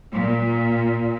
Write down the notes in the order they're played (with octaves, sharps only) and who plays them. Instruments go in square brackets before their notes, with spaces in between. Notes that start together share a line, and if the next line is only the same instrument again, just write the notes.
[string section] A#2